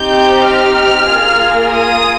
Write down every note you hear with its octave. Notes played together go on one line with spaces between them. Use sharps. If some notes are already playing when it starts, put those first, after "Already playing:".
Already playing: C4 D#4 G4 G6
F6
A#3 F4 G#4
D#6